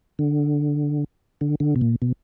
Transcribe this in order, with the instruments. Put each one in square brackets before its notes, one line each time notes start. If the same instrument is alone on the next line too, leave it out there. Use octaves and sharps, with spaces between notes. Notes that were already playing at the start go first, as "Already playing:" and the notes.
[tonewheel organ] D3
D3
D3
B2
A#2
B2